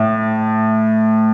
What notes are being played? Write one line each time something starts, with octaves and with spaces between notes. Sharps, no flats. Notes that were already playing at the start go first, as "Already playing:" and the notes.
Already playing: A2